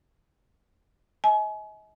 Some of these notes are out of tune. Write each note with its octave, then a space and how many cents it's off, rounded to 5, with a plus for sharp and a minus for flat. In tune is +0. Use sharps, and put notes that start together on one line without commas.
D#5 +40 G#5 +35